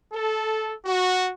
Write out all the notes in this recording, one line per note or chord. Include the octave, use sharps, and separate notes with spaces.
A4
F#4